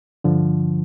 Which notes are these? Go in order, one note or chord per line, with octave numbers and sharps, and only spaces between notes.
G2 D3 F3